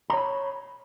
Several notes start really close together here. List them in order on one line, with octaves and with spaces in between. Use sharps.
A#5 C#5 B5